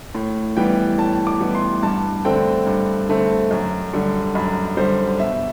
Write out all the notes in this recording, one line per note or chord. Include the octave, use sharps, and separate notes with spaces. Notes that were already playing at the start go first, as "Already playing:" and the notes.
A2
E3 G3 B3 G5
A2 A5
D6
E3 G3 B3
C6
G2 A5
D3 A3 C4 G5
G2
D3 A3 C4
F#2
D3 G3
F#2 B5
D3 G3 C5
B2 E5